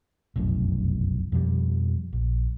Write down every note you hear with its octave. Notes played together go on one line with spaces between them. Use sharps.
F1 B1 F#2 A2
F2 B2 F3 G3
A#1